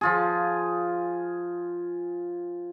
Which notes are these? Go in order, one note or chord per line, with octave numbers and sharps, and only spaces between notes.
F3 F4 G#4